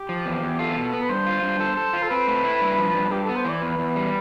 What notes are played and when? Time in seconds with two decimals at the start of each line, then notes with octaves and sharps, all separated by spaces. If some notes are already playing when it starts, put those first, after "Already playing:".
Already playing: G4
0.09 F3
0.26 E2
0.42 E2
0.59 F4 A4
0.77 B2
0.93 B3
1.02 B4
1.09 G2 C5
1.26 F4
1.43 G2
1.60 A4
1.77 A4
1.93 F4
2.03 A4
2.10 C4 B4
2.27 A3
2.44 E4
2.61 G2
2.78 F3
2.95 G2
3.11 G2 G4
3.23 A4
3.29 B3
3.36 C5
3.45 E3 D5
3.62 E2 B4
3.79 E2
3.96 G3